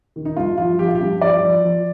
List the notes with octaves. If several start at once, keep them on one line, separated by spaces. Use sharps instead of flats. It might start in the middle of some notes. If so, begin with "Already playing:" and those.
D#3
D#4
G2 F4
F3 F4
F3 G4
F4
G4
G2
F3 D5
F3
F3